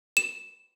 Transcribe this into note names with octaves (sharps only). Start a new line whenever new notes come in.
E7